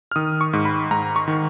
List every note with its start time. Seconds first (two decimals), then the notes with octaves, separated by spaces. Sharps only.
0.11 F6
0.16 D#3 D#6
0.41 C#6
0.53 G#2
0.65 B5
0.91 G#2 A#5
1.16 C#6
1.28 D#3